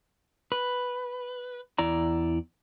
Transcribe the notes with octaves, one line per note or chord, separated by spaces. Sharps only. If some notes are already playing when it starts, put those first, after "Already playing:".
B4
E2 E4 D5 A#5